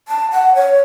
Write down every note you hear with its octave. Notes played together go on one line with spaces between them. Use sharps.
A5
F#5
C#5